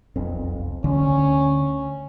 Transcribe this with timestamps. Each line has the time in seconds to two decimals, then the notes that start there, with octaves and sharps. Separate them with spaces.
0.16 E1 B1 F2 C4
0.84 D2 D3 C#4